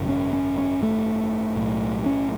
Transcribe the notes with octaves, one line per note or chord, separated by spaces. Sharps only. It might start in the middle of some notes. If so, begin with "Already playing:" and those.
Already playing: G#1 F#2 C#3
C#4
C#4
C#4
A3
B1 A2
C#4